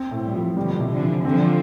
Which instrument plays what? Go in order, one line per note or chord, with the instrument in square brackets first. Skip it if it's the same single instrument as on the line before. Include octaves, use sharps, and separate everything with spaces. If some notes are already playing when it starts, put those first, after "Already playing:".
Already playing: [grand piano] C4
A2
[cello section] E3 G3
[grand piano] F3
[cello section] B2 D3 [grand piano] G3
[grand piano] C3
[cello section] D3 F3
[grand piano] E3
[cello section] D3 F3 [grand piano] C4